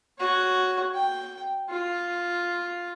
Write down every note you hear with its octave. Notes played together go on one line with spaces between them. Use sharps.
F#4 C#5
G5
F4